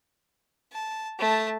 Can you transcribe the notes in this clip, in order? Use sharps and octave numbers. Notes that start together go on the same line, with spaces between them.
A5
A3 A5